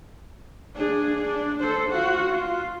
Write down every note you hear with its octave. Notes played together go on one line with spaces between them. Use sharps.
D4 G#4
D4
A4 C5
F4 F#4
F4